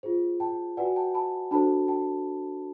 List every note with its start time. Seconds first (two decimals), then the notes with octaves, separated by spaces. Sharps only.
0.03 F4 G#4 C5
0.40 G5 A5
0.77 F#4 B4 D5 F#5 G#5
0.96 G5 A5
1.14 A5 B5
1.51 D4 F#4 A4 C5 A5 B5
1.88 G5 A5